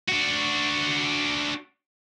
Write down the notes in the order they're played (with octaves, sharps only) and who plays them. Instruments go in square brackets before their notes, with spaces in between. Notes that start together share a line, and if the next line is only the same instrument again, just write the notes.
[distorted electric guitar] D4 F#4